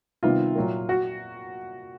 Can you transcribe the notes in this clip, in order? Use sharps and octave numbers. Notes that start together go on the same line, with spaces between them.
C3 D#3 G3 B3 F4
A#2 F#3 A#3
F#4